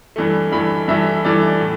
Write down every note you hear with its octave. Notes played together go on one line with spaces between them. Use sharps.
G2 E3 A3
G2 E3 A3 B5
G2 E3 A3 E5
G2 E3 A3 D5
A2